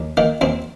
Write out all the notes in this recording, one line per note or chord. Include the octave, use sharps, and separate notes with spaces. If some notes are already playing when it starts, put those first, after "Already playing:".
Already playing: D#2
D#3 A#3
D#2 C4